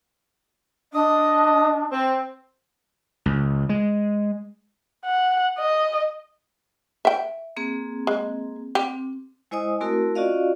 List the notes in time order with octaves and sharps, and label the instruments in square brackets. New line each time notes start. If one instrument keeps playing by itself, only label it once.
[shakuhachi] D4 [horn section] D#5
[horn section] C4
[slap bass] C#2
G#3
[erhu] F#5
D#5
[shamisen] E5 G5
[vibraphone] A#3 C4 G#4
[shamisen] G#3
[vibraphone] C4 [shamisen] G4
[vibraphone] G#3 E4 C5 D#5 G#5 D#6
A3 C4 E4 F#4 A#4
C#4 F4 F#4 D5 D#5 F5